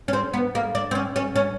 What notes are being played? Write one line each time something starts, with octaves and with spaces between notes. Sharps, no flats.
C#4
C4
B3
A#3
D4
C4
C#4
C#4
C#4